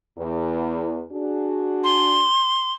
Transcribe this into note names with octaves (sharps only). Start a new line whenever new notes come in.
E2
D4 F#4 G#4
C6